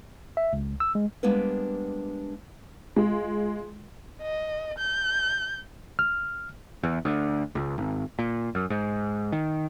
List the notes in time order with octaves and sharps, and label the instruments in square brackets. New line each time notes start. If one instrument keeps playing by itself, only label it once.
[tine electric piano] E5
C#2
E6
G#3
[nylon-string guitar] G3 G#3 A#3 B3 D4 B4
[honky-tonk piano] G#3 F4
[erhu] D#5
G6
[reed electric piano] F6
[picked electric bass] E2
D2
C#2
G#1
A#2
F#2
G#2
D#3